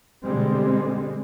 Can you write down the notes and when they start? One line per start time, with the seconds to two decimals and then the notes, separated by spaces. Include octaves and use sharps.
0.24 B2 D3 G3 G#3 C4